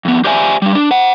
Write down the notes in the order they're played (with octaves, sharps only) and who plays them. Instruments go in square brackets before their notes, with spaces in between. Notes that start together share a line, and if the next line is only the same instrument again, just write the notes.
[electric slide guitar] F2 B3
G4 C5 D5 E5 G#5
G3 D4
D4
C5 F#5